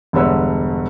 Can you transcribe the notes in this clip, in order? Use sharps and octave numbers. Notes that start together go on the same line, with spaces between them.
E1 G2 D3 B4 C#5 E6